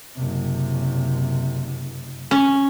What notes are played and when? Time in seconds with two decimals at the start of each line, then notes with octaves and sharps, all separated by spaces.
0.15 F#1 C3
2.31 C#4